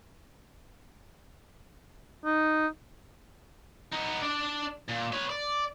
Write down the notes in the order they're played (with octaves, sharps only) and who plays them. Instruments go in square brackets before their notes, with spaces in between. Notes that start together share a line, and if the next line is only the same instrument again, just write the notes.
[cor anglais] D#4
[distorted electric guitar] B3 D#4
D4 D5
A#2
B4 C#5
D5